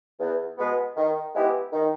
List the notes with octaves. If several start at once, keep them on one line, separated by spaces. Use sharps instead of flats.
E2
B2 G#3 B3
D#3
G#3 B3 E4 G4
D#3